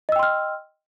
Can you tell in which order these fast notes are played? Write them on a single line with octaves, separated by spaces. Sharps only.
D#5 E6 G5 C6 F6